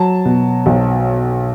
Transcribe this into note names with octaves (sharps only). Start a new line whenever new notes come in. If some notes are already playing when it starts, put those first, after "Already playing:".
Already playing: F#3 A5
B2
B1